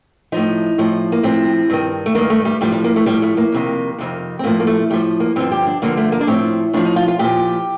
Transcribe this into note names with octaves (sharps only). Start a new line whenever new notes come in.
A2 F3 D#4
A2 F3
A#3
A2 F3 C4
G2 D#3
A3
G2 D#3 A#3
A3
G3
A2 F3 G3
G3
A#3
A3
A2 F3 G3
A3
A#3
F2 C3 D#3
F2 C3 D#3
C4
A2 F3 A#3
A#3
A3
A2 F3 G3
A#3
G2 D3 F3 C4
G4
D4
G2 D3 F3 A#3
A3
A#3
D4
A2 F3 C4
A2 F3 D4
D#4
F4
F4
A#2 F3 G4